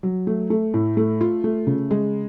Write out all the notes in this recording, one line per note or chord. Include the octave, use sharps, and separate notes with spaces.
F#3
A3
A3
A2
A3
F4
A3
C#3
G#3